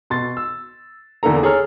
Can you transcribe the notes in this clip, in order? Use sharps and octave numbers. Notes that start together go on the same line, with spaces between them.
B2 C6 A6
E6
E2 D3 A#3 D4 A4 A#5
G#4 A4 C#5 A#5 F6